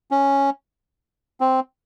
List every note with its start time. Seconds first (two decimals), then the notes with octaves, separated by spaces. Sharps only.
0.11 C#4
1.41 C4